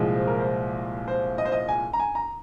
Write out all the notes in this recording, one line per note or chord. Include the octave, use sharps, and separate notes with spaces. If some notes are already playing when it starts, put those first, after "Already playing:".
Already playing: C2 A#2 F3 G#3
C5
A#4
C5
C5
D#5
C5
D#5
G#5
A#5
G#5
A#5